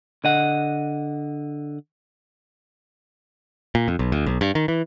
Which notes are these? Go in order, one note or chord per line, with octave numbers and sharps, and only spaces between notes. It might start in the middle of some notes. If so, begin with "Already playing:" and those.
D3 D#5 F#5
A#2
F2
B1
D2
B1
G2
D#3
E3